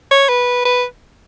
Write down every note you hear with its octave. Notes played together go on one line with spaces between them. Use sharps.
C#5
B4
B4